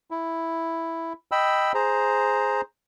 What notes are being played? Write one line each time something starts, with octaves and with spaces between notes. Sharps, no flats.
E4
D#5 G5 B5 E6
G#4 C5 A#5